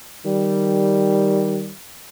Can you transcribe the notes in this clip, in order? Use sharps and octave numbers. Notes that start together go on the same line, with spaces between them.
D#3 G3